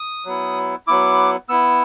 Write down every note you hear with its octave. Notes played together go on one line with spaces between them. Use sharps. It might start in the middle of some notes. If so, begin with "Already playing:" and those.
Already playing: D#6
F#3 B3 E4
F#3 B3 E4 D6
B3 E4 E6